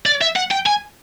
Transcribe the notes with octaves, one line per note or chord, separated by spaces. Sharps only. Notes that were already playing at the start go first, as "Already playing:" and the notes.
D5
E5
F#5
G5
G#5